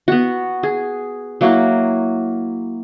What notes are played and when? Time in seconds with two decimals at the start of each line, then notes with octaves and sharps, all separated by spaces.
0.08 B3 F#4
0.63 G#4
1.41 F#3 A#3 E4 F#4